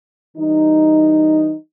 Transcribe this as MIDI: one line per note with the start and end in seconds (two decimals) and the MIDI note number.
0.37 1.54 52
0.37 1.54 55
0.37 1.54 63